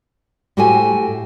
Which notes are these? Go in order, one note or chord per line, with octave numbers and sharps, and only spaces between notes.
A2 F#4 G4 A4 C5 G#5